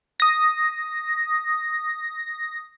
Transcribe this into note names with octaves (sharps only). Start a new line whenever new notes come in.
D#6 A#6